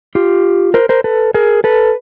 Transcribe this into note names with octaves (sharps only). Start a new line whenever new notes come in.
F4 G4
A#4 C5
A#4 C5
A4 B4
G#4 A#4
A4 B4